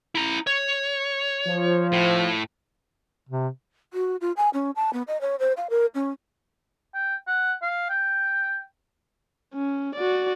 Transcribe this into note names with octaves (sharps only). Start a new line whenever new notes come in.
E4 A#5
C#5
F3
A2
C3
F#4
F4
G#5
C#4
A5
B3
D#5
C#5
C5
F5
A#4
C#4
G5
F#5
F5
G5
C#4
F#4 D5